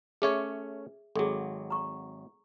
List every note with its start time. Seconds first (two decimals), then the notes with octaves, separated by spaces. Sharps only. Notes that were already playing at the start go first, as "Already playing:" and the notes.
0.22 A3 C#4 G#4 C#5 E5
1.16 G#1 F#3 G#4 A4
1.70 A#5 C#6